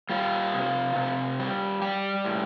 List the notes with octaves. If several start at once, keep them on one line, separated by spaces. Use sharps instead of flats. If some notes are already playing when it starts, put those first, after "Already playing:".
G3 F4
C3
C3
G3
G3 G4
A2